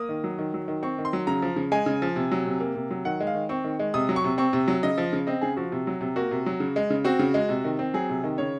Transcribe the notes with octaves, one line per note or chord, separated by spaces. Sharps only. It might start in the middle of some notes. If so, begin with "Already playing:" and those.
Already playing: A#3 D#6
D#3
F#3
D#3
F#3
D#3
C4 C#6
D#3
C6
F#3
C#3 A#5
F3
C#3
G#3 G#5
C#3
F3
C3
F#3
C3
A#3
C3
F#3
D#3 F#5
G#3
F5
D#3
C4 C#6
D#3
G#3
C3 D#6
F#3
C#6
C3
C4 C#6
C3
F#3
C#3 D#5
F3
C#3
C4 D#5
C#3 G#4
F3 F#4
C3
F#3
C3
A#3 F#4
C3
F#3
C#3
G#3
C#3
C4 F#4
C#3
G#3
C3
D#3
C4
F#3 G#4
C3
D#3
C#3 C#5